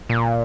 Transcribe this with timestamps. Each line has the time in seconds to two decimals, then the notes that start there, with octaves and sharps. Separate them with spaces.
0.09 A#2